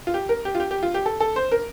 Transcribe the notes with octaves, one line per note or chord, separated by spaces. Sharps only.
F4
G4
A#4
G4
F4
G4
G4
F4
G4
A4
A4
C5
A#4